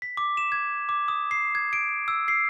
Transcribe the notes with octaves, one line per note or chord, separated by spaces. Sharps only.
B6
D6
E7
G#6
D6
D#6
C7
G#6
D7
E6
C7